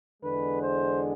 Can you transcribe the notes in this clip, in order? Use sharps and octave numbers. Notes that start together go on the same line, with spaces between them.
E2 D3 G#3 B4
C5